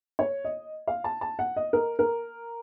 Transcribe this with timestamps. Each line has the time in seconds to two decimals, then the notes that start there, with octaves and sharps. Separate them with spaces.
0.19 C#5
0.45 D#5
0.87 F5
1.04 A5
1.21 A5
1.39 F#5
1.56 D#5
1.73 A#4
1.99 A#4